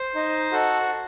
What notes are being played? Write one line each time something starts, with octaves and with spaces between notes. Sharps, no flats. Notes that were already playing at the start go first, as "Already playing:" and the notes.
Already playing: C5
D#4
F#4 A4